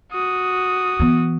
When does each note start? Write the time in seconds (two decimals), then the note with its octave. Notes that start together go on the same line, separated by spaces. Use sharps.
0.12 F#4 D#6
0.99 E3 B3